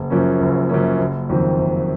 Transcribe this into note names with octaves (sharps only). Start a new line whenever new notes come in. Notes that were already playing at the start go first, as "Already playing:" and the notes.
Already playing: F#1
F#2 F3 A#3 C#4
F#1
F#2 F3 A#3 C#4
F#1
F2 D#3 F#3 C4
F#1